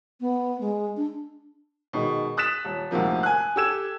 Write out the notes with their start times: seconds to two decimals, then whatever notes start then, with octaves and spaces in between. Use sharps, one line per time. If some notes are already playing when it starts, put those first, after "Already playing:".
0.21 B3
0.61 G#3
0.97 D4
1.93 B2 D#3 G#3
2.37 D#6 F#6 A6 B6 E7
2.64 D#1
2.91 D2 G#2 C3 F3 A#3
3.23 G#5 F#6
3.56 G4 A4 E6 G#6 E7